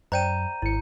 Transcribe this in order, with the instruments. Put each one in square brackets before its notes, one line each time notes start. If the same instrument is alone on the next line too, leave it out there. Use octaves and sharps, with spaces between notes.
[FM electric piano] F#2 [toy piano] C5 D5 G5 [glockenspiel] A#5 G6 D#7
[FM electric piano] G#1 C#7 [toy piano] E4